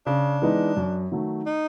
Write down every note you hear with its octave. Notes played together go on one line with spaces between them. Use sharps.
C#3 D4
E3 G#3 B3 D#4
F#2
D#3 F#3 A3
D#4